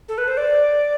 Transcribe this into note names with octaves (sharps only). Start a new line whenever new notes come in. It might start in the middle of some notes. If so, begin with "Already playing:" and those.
A4
B4
C5
D5